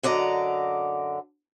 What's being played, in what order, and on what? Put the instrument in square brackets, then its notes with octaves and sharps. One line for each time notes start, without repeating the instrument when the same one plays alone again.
[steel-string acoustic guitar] F#2 D3 D5 D#5 A#5